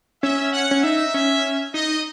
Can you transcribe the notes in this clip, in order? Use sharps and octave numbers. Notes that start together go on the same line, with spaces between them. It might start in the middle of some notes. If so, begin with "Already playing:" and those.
C#4 E5
F#5
C#4
D#4 E5
C#4
D#4 D#5